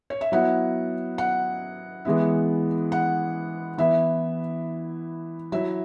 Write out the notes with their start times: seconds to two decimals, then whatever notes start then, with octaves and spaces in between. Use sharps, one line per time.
0.10 C#5
0.21 E5
0.32 F#3 B3 E4 F#5
1.18 F#5
2.05 E3 G#3 B3 E4
2.92 F#5
3.78 E3 B3 E4 E5
5.52 F#3 E4 E5